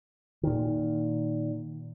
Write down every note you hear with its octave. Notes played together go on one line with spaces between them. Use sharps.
A#2 D#3